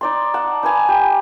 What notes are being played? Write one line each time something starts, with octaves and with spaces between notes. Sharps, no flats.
D#4 D5 C6
F#5 A5
D#4 B4 G#5
G4